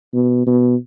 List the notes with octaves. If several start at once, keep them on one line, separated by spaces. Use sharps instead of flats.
B2
B2